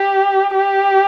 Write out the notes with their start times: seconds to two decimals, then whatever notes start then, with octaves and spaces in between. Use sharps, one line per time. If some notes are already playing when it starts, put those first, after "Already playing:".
Already playing: G4
0.57 G4